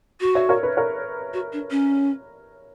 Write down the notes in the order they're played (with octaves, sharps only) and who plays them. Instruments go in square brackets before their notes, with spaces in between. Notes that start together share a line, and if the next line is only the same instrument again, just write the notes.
[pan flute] F#4
[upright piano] C#5 E5
A#4 C#5
B4
A#4 C#5
[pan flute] F#4
D4
C#4